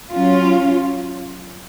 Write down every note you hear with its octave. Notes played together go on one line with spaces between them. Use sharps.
F#3 C#4 F4